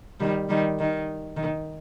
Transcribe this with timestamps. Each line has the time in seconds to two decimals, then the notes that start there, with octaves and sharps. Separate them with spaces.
0.20 D#3 G3
0.49 D#3 G3
0.79 D#3
1.36 D#3